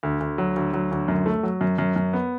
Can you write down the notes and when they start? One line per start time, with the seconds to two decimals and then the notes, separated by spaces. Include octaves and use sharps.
0.03 D2
0.20 D2
0.38 F#3
0.56 D2
0.73 F#3
0.91 D2
1.08 F#2
1.26 A3
1.43 F#3
1.61 F#2
1.78 F#2
1.96 F#2
2.13 B3